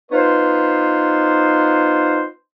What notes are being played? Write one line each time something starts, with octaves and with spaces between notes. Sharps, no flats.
B3 D#4 F4 B4 C5